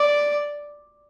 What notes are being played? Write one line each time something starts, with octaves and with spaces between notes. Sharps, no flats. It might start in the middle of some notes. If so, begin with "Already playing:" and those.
Already playing: D5